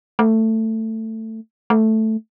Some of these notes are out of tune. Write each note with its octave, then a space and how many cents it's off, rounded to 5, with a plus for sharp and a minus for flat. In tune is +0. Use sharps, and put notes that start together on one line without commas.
A3 +15
A3 +0